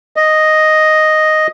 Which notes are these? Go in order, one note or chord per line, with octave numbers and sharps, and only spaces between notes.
D#5